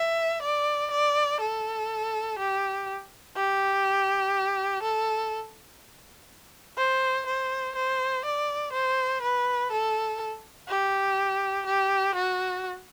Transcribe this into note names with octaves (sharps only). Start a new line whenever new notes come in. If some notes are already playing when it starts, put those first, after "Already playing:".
Already playing: E5
D5
D5
A4
G4
G4
A4
C5
C5
C5
D5
C5
B4
A4
G4
G4
F#4